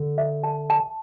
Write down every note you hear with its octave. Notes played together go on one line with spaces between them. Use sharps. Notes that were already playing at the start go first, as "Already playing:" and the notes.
Already playing: D3
E5
A5
A5